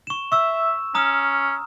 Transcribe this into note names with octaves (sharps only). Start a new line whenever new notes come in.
C#6 E7
E5 C#6 E6
C#4 A#5 D#6 F6